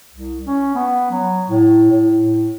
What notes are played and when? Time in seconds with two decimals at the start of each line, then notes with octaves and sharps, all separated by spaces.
0.14 C2
0.47 C#4
0.75 B3
1.11 F#3
1.49 A2
1.91 A2